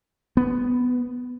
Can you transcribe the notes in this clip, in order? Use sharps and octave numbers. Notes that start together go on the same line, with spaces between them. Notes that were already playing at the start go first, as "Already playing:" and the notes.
B3